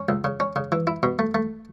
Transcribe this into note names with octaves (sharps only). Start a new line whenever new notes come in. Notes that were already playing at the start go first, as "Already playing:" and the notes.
Already playing: C#4
C#2
C#3
C#4
C#3
E3
E4
B2
A3
A3